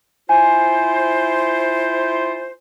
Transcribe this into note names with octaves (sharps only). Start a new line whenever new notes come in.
E4 F4 C5 G#5